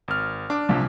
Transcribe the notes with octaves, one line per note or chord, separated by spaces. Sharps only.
G#1 F6
D4 D6
C2 A#2 F3